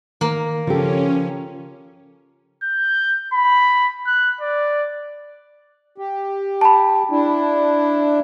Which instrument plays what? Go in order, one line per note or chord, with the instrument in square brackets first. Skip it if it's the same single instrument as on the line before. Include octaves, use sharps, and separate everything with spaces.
[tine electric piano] D#3 [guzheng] A#3
[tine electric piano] C#3 A4 [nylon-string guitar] F3 G4 [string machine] C#4
[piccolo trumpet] G6
B5
F#6
D5
[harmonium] G4
[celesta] A5 B5
[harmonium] D4 E4